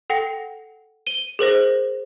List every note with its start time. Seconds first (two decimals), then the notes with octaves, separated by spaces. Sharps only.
0.10 A4 F#5 G5 A#6
1.07 D#7 G7
1.39 G#4 A#4 C5 A#6